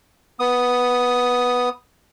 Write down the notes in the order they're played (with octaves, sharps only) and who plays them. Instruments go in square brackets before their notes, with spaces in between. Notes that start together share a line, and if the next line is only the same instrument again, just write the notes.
[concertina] B3 D#6